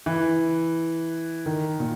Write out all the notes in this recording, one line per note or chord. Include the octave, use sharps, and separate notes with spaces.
E3
D#3
A#2